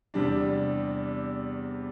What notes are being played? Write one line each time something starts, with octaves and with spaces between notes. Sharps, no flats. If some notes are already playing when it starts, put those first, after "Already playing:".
E2 C3 G3 D4